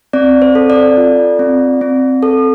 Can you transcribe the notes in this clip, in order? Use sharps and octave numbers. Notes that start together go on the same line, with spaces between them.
C4 D5
C5
A4
D5
F4
C4
C4
A4